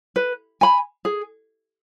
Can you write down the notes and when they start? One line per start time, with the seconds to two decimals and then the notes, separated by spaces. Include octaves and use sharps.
0.16 B4
0.61 G#5 B5
1.05 G#4